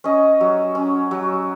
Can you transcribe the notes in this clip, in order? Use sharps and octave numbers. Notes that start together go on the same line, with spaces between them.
C#4 D#5
F#3
C#4
F#3